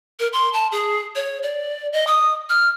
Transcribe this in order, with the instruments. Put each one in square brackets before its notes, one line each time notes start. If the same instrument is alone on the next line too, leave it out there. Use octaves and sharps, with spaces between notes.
[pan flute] A#4
C6
A5
G#4
C#5
D5
D#5
D#6
F6